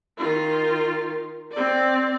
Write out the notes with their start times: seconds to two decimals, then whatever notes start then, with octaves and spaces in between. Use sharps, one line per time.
0.18 D#3 F4
1.52 C4 D5